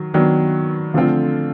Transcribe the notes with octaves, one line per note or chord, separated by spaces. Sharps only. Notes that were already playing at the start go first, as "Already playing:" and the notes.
Already playing: D#3 F#3
D#3 F#3 B3 D4
D3 F3 A3 C4 F4